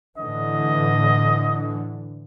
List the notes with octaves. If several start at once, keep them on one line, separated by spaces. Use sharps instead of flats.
A2 D3 E3 D#5